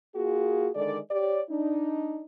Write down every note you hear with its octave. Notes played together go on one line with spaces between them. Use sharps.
A#3 F4 F#4 G#4
D3 D#3 G#3 A4 D5
G4 C#5 D5
D4 D#4